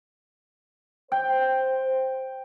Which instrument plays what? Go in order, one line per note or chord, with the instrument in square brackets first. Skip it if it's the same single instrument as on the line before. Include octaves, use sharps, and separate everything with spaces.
[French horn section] C5 [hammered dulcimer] G5